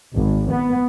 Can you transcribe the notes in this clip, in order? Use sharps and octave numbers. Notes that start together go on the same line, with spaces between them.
G#1
B3